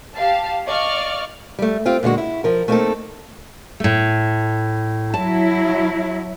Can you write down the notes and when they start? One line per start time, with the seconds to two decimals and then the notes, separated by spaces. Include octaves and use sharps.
0.15 G4 F5 A5
0.66 D5 D#5 F5 C#6 F6
1.59 G3 A3
1.86 C4 F4 G4
2.03 A#2 D3 G#3 F#4
2.18 E4
2.44 F3 A#4
2.68 A3 A#3 C4 D4 D#4 A4
3.80 A2 A3
5.14 F#3 E4 A5